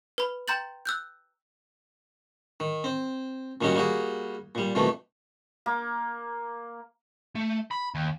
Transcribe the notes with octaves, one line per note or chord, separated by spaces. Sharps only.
B4 B5
G5 A#5 C6 G6 A6 F#7
E6 F#6 G6
D#3
C4
A#2 D#3 G3 C#4 D#4 F#4
G3 A#3 F#4 G#4
A#2 G3
F2 B2 D#3 E3 A3
A#3
A3
B5
D#2